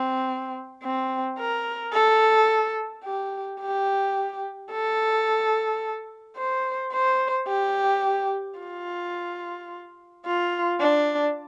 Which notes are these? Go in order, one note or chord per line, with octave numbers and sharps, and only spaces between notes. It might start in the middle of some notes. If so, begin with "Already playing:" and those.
Already playing: C4
C4
A#4
A4
G4
G4
A4
C5
C5
G4
F4
F4
D4